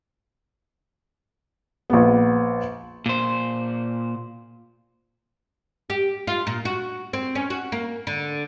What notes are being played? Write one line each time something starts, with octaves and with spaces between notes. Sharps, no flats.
A#1 B3
A#2 C5
G4
F4
A#2
F#4
C4
C#4
F#4
A#3
D3